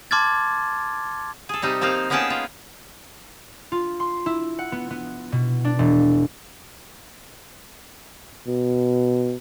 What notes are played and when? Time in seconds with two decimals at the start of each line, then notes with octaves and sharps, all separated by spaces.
0.11 A5 C6 D6 F6 G#6 A6
1.49 G#4 A4
1.62 C3 G3 D#4
1.81 F3 A#3 C4 D#4 F5
2.10 A#3 B3 C#4 G#4 G5 A5
2.30 F4
3.72 F4
4.00 C6
4.26 E4
4.59 F#5
4.72 B3
4.90 B3
5.32 B2
5.64 D4
5.79 E1
8.47 B2